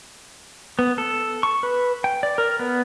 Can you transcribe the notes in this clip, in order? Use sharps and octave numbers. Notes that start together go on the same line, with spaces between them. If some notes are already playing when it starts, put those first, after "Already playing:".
B3
A4
C#6
B4
G5
D5
A#4
B3